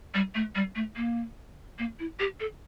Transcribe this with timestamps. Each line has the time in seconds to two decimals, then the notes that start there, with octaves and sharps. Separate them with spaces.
0.14 G3
0.35 A3
0.55 G3
0.76 A3
0.96 A#3
1.79 A#3
1.99 E4
2.20 G4
2.40 A4